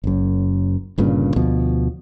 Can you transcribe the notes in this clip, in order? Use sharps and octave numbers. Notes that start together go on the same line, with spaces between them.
F#1 F#2
G1 G2 A#2 C#3
D2 B2 F3